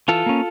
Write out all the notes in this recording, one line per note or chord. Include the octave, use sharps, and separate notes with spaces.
E3 F4 A4
A#3 C#4